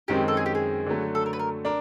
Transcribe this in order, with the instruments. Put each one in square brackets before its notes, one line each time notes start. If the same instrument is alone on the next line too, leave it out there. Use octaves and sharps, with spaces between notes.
[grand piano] F#2 D#3 G#3 C4 [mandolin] G4
[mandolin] A4
G#4
G4
G#4
[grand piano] D3 F#3 A3
[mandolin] A4
A#4
B4
A#4
[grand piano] D4 [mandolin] A#4